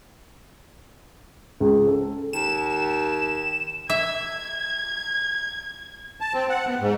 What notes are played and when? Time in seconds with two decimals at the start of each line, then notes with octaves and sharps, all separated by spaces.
1.60 C#2
1.87 A4
2.33 D#2 E7
3.90 E5 G#6
6.20 A5
6.34 C4
6.49 F#5
6.67 B3
6.80 G#2